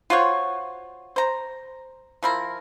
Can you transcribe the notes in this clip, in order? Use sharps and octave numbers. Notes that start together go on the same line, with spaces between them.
F4 F#4 C5 C#5
C5 A#5
F3 E4 A#4